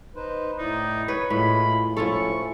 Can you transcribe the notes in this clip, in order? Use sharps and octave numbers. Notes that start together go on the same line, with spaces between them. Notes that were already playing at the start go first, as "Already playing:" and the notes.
D#4 B4 C5
A2 D#4 E4 D5
B4 C#5
A2 G#3 E4 F4 B5
G#2 F3 C#4 E4 F4 A4 C#6